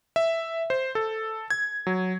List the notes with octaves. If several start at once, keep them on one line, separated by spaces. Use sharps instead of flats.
E5
C5
A4
G#6
F#3